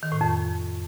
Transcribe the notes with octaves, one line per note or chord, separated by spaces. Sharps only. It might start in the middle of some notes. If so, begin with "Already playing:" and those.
D#3
A2
F2